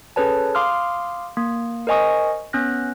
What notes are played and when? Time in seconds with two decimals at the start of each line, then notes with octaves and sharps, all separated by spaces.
0.16 C#4 G#4 A4 B4 C#5 A5
0.55 F5 C6 D6 D#6 F6
1.37 A#3
1.87 A#4 C5 D#5 G#5 C#6 D#6
2.53 B3 C#4 F6 F#6 A#6